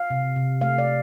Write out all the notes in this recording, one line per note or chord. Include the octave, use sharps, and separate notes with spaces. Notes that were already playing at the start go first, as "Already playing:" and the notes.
Already playing: F5
C3
C3
A3 F5
D5
A3